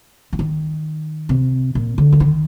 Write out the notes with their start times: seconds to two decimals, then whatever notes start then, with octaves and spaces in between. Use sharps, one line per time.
0.33 F3
0.39 D#3
1.29 C3
1.75 A#2
1.98 D3
2.12 F3
2.20 D#3